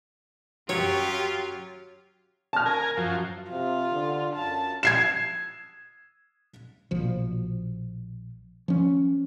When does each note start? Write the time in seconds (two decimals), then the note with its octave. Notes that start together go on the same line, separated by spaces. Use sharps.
0.69 F#2 F#3 F4 G4 C#5
2.53 A5 F6
2.66 A#4 G#5
2.97 F#2 F3
3.51 C3 F4
3.91 D3
4.36 F#2 A5
4.83 G#6 C7 E7
6.91 A#1 B2 F3
8.68 F3 C#4